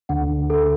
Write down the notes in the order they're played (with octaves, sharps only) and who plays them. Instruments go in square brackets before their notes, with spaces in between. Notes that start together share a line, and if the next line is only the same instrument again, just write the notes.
[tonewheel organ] D2 D3 [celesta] F#5
[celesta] A4